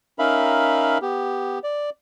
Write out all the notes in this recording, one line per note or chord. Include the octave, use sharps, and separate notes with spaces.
C#4 D#4 A#4 E5 F5 B5
B3 G4
D5